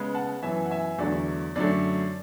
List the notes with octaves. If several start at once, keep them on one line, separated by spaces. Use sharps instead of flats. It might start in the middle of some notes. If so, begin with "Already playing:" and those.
Already playing: C#3 G#3 B3
F#5 A5
F#2 E3 B3 E5 G#5
F#5
E5 G#5
E2 D3 F#3 A3 D5
F#2 D3 F#3 A3 D5